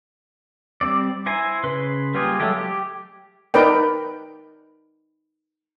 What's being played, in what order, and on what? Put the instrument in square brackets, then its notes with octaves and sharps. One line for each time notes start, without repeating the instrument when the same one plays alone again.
[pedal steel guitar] G3 C4 D5
E4 C5 G#5 A#5
C#3 B4 C6
G3 A#3 F4 G4 G#4
F#3 G#3 A3 G4
G4
[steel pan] D#4 A#4 B4 D5 G5